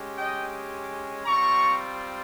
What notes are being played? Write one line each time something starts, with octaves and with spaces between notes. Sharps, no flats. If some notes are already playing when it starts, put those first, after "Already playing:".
Already playing: G#3 C#4 G4
D#5 G5
G3 C4 F4 A#5 C#6